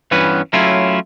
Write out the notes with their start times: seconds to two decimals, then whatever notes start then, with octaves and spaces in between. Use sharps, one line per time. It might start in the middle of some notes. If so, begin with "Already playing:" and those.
0.11 G2 E3 B3 C#4 B4
0.53 F#3 A3 C#4 E4 F4